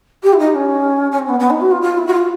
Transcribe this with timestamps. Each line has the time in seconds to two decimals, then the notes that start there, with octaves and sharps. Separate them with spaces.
0.23 G4
0.33 E4
0.39 D#4
0.55 C#4
1.12 C#4
1.19 C4
1.29 B3
1.40 B3
1.50 D#4
1.61 F#4
1.71 F4
1.82 F4
1.98 E4
2.07 F#4
2.13 F4